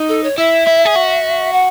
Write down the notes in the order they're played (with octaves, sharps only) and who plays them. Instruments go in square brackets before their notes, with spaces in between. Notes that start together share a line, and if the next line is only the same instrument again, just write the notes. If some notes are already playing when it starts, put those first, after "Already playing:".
Already playing: [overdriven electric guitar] D#4
[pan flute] A4
C#5
[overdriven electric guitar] E4 [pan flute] E5
[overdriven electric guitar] E4
G#4
F#4
[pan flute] F#5